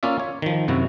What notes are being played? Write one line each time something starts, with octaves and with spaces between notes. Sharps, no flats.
A#3 C#4 F4 D5 E5
C#5
D#3 F3
F#2 C3 E4 F#4